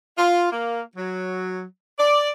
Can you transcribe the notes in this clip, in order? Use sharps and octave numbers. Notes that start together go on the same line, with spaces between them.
F4
A#3
F#3
D5